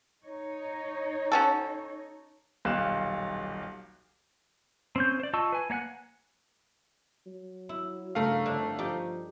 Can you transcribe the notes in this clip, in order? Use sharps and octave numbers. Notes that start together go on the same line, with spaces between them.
D#4 C#5
C#4 F#4 A4
D#1 B1 G4 F5 F#6 E7
C4 C#4 G6
C5 D5
F4 D#5 A5 C#6 E6
B4 G#5
A#3 C#5 F#5 G#5 F#6
F#3
E4
G2 C#3 A3 A#4 F5
F1 D3 D4
F3 D#4 G4 D5